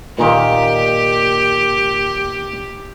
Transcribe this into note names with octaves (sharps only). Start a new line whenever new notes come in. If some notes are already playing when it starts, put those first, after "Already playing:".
A#2 D#3 A#3 G4